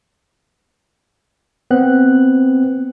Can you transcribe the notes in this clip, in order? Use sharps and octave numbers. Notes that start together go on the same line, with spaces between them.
B3 C4 F#6